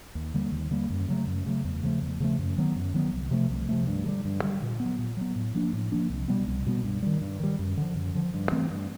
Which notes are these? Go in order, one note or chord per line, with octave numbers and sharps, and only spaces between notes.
D#2
D3 G3 A#3
D#2
D3 G3 A#3
F#2
C#3 F#3 A3
F#2
C#3 F#3 A3
E2
C#3 F3 A3
E2
C#3 F3 A3
F#2
D#3 F#3 B3
F#2
D#3 F#3 B3
C2
C3 F3 A3
C2
C3 F3 A3
G2
D3 G3
G2
D3 G3
A#2
F#3 B3
A#2
F#3 B3
A2
F3 A#3 D4
A2
F3 A#3 D4
C2
B2 G3 B3
C2
B2 G3 B3
G2
D#3 G3
G2
D#3 G3
F#2
D3 F3
F#2
D3 F3
G2
E3 A3 C4
G2